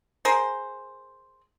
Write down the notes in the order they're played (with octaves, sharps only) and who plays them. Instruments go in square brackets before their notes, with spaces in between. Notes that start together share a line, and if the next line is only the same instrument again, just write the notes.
[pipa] G#4 A#4 C5